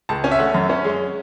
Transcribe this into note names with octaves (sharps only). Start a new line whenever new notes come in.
C#2 A5
C#4 G#5
E5
A3 F#5
F#2
C#4
G#3